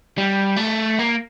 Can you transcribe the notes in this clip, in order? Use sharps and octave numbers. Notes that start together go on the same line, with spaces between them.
G3
A3
A#3